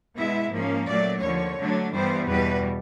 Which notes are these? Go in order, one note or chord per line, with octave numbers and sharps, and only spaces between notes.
B2 G#3 B3 E4 E5
G#2 F3 A#3 C#4
A#2 F#3 A3 D5
D#2 D3 F3 C#5
D3 F#3 A3 D4
G2 E3 G3 B3 C5
E2 B2 G3 B4